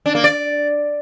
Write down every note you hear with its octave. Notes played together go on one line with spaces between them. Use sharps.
D4
A#3
D5